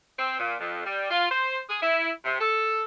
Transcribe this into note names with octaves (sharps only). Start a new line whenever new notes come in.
C4
A#2
F2
G3
F4
C5
G#4
E4
C3
A4